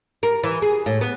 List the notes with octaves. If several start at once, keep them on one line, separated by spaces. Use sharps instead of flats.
A#4
E3
G#4
A2
B3